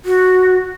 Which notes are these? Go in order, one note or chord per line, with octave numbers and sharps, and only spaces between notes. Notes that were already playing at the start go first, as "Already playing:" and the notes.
F#4